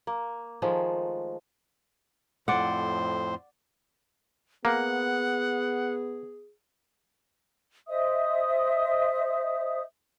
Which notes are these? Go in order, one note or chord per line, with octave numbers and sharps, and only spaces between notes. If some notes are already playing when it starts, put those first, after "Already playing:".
A#3
D#3 F3 G#3 A3
F2 A2 C5 D5 F#5
A#3 B3 G#4 F#5
C5 D#5 E5 D#6